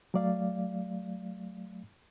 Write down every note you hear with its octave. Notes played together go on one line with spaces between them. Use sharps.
F#3 A3 D5 F5